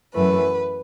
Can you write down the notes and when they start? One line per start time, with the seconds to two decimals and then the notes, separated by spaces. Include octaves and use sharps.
0.14 F#2 E3 A3 B4